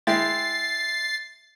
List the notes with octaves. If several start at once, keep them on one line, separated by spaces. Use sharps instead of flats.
G#3 E4 G5 A6 C7